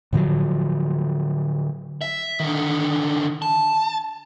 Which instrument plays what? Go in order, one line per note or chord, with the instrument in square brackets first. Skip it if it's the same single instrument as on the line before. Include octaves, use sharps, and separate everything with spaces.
[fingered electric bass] A2 D3 F3 F#3
[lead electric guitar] E5
D3 D#3
A5